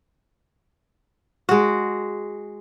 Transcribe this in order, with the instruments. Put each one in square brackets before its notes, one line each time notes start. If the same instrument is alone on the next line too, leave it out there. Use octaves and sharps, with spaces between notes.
[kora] G#3 F#4